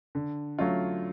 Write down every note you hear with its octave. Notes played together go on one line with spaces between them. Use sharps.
D3
F#3 A3 C#4 F4